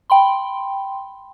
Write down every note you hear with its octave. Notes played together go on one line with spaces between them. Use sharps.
G5 B5 C6